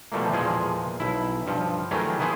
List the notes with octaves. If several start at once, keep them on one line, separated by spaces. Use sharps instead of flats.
B2 E3 F3 G3 A3 A#3
E2 A#2 F3 G#3 G#4
B1 E4
G2 F3
D#3 E3 F#3 A3 G4 G#4
B3 E4 G#4 C5